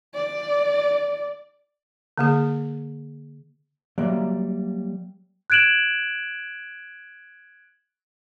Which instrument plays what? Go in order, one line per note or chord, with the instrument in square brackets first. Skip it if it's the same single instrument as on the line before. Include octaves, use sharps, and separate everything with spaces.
[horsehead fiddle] D5
[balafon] D3 A#3 G#4
[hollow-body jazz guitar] F#3 G3 A#3 D5 E5
[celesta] F#6 G#6 D7 E7 F#7